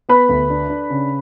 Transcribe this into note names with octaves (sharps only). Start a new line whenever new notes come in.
B3 B4 B5
D2
D4
D4
C#3